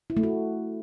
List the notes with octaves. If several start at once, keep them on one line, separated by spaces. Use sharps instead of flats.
E4
A3
F#4